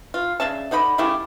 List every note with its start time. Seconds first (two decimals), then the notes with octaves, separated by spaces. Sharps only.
0.14 F4
0.40 C#3 D4 E5 A5
0.71 D3 D#4 D#5 B5
0.98 C#3 A3 E4 G4